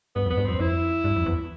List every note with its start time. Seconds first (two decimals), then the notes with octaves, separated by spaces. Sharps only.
0.15 G2 B3
0.26 F2
0.30 B3
0.38 G2
0.45 F2 C4
0.60 F2 E4
1.04 G2
1.16 F2
1.26 E2